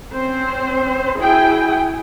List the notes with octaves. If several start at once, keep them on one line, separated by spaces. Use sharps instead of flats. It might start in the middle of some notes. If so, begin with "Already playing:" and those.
C4 C#4 C5
E4 F#4 G#4 G5 G#5